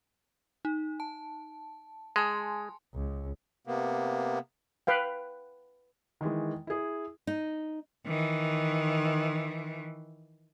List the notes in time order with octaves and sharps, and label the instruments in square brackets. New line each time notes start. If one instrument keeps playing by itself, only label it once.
[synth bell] D#4
A5
[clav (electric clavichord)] G#3 [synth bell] G#5 A5 C6
[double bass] C#2
[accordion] C3 A#3 B3
[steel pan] B4 F5 G5
[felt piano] D#3 E3 G#3
E4 G#4
[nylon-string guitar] D#4
[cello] D#3 E3